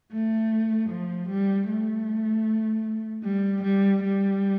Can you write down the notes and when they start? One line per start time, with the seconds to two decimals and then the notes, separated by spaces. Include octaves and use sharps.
0.12 A3
0.90 F3
1.29 G3
1.68 A3
3.24 G3
3.63 G3
4.03 G3